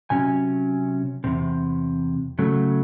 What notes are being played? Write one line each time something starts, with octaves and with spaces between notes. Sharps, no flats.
C3 F#3 C#4 G#5
E2 C3
C#3 F#3 A3